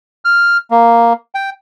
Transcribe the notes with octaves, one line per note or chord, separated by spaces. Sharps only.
F6
A#3
G5